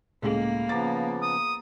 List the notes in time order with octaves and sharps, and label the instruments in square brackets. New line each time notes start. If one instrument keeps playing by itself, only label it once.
[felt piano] C#2 A2 G#3 [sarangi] A#3
[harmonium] C#3 F3 B3 [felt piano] A#5 D6 A6
[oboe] D#6